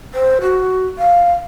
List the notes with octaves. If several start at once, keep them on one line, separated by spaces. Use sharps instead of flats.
C5
F#4
F5